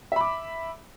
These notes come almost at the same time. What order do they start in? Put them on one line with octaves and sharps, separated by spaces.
E5 B5 D6